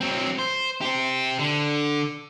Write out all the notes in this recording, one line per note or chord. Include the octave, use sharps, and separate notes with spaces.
F#3 C4
C5
G4 C5
D3